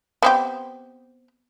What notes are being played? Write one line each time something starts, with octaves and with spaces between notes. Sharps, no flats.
B3 C4 G4